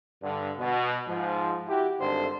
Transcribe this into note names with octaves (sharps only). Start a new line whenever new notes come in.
G2 D3
B2
G#2 F3
E4 F#4 G4
G#1 G2 D3 A4 C5